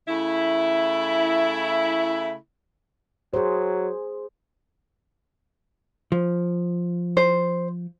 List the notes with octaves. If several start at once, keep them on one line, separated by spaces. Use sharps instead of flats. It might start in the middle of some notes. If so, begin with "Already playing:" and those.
C#3 A3 E4
F#3 G#4 C5
F3
C5